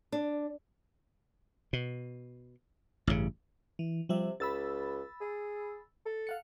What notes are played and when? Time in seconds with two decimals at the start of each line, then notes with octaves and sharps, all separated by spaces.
0.12 D4
1.73 B2
3.07 A1 G2 A#2 C#3
3.79 E3
4.09 C3 F3 G3 E5
4.40 C#2 B5 E6 A6
5.21 G#4
6.06 A4
6.27 F5 F#5 C#7